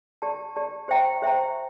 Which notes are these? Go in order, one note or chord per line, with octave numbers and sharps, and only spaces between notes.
G4 D5 A5
G4 D5 A5
G4 C5 E5 G5 A#5
G4 C5 E5 G5 A#5